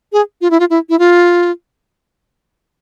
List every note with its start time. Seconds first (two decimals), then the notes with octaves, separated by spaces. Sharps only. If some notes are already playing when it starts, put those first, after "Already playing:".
0.13 G#4
0.41 F4
0.51 E4
0.60 F4
0.70 E4
0.89 E4
0.99 F4